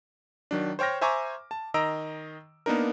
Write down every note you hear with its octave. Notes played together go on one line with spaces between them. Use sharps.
D#3 F#3 D4
C5 C#5 G5 F6 A#6
C5 E5 G#5 A#5 C#6 D6
A5
D#3 D#5 A#5 E6 D7
A#3 B3 D4 D#4 A#4